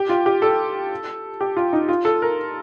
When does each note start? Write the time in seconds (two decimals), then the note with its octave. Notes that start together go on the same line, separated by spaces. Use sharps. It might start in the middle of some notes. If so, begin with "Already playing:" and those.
Already playing: G4
0.09 F4
0.26 G4
0.42 A4
1.41 G4
1.57 F4
1.73 D#4
1.89 F4
2.05 A4
2.22 A#4